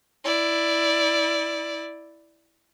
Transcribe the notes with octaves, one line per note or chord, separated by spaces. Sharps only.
E4 D5